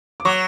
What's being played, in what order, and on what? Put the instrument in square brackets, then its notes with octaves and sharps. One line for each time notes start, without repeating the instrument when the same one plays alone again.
[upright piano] D6
[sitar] F#3 [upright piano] C#6